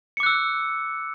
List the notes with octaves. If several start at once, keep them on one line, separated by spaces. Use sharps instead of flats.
D6 E6 F#6 C#7